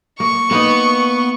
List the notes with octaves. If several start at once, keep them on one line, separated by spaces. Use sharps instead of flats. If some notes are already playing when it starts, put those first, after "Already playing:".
A#3 C#6
A#3 B3 D#4 B4